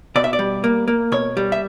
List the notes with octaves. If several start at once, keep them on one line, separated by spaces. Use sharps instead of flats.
B2 D5
E5
D5
G3
A#3
A#3
B2 C#5
G3
E5